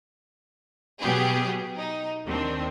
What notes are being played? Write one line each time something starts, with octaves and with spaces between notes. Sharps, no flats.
B2 F#3 B3 G4 G#4
D#4
D#2 D#3 C4 D4